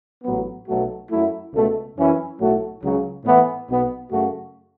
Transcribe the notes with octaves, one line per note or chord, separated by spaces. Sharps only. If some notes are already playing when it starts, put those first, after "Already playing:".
A1 A2 F#3 B3
B1 B2 F#3 A3 F#4
F#2 F#3 A3 E4
C#2 B2 A3
F#2 E3 C#4 E4
B1 A2 F#3 A3 F#4
C#2 C#3 F#3
A2 E3 B3
B1 B2 B3
F#2 C#3 A3 F#4